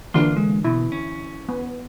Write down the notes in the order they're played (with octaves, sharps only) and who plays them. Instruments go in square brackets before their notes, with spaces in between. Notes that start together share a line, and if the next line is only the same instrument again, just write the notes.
[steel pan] D3 E3 A#3 [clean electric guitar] D4 F4 C6
[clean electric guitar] G#3
[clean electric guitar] B2 [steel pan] E4
[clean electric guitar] C#4
[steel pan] B3